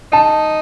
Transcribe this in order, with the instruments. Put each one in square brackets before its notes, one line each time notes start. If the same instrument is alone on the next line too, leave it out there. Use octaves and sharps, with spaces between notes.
[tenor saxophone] D#4 [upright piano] A5